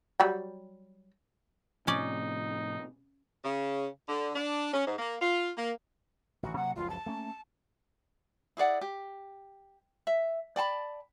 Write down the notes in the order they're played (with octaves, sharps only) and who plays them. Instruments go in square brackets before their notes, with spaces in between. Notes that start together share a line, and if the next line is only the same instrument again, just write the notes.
[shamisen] F#3 G3 G5
[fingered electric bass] A2 C3 F3 [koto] C#4 D5 [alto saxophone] D#4
[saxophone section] C#3
D3
D4
C#4
G#2
A#3
F4
A#3
[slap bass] A1 D#3 [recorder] F#4
[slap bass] C3 F#3 A#3 [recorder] F#5
[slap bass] F#1 C#2 F3 [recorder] F4
[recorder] A5
[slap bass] A3 A#3 C#4
[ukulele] E4 G#4 D5 F#5
G4
E5
D5 G5 A5 B5